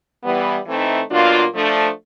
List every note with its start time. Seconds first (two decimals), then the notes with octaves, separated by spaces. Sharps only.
0.23 E3 G3 B3
0.66 E3 A3 C4 D#4
1.10 B2 F#3 A#3 D4 F4
1.54 F3 A3 D4